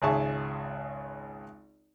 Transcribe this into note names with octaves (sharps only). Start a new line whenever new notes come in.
G#1 C#2 G#4 E5 A5 C#6